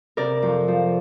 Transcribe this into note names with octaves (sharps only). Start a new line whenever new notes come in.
C3 A#4 D5
F2
F3